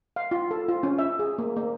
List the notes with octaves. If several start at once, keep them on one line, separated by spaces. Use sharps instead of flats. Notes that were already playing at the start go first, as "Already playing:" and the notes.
F5
F4
A4
F4
C#4
E5
G#4
A#3
A#3